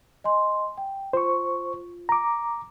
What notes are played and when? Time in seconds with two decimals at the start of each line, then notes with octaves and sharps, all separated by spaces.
0.24 D#5 G#5 C6
0.78 G5
1.13 F4 C5 C#6
2.09 A#5 D6